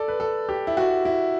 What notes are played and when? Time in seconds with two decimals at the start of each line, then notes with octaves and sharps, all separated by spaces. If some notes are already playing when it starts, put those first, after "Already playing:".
Already playing: A4 D5
0.08 B4
0.20 A4
0.49 G4
0.67 E4
0.77 F#4
1.05 E4